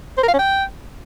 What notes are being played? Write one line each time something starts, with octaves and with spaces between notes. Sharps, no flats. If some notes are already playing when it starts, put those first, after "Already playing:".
C5
A#4
F5
C#4
G5